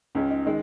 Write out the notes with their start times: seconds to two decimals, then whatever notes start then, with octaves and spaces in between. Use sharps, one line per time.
0.15 C#2 C#3 G#3 C#4
0.30 D#4
0.45 D#3 G#3 D#4